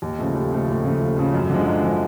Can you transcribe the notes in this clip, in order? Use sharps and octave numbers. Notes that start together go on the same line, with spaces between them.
D#2
C#3 F3 A3
D#2
C#3 F3 A3
D#2
C#3 F3 A3
D#2
C#3 F3 A3
F#2
D3 F3 G#3
F#2
D3 F3 G#3